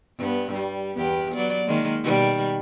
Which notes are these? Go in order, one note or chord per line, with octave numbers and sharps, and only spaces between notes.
G2 B3
G3
E2 B3 G4
F#3 B3 D5
D#3 G#3 A#3
B2 D#3 G3